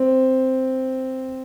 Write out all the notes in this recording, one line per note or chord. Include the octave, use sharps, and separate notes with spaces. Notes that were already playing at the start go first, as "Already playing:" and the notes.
Already playing: C4